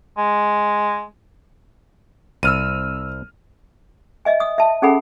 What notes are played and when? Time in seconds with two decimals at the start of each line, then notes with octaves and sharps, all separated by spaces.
0.17 G#3
2.43 C2 E6 F6 D#7
4.25 D#5 E5 G#5
4.40 D#6
4.58 E5 A5
4.82 C#4 G#4 A4 F#5 G#5 B5